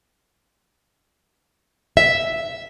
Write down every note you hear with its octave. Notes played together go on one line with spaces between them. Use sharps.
E5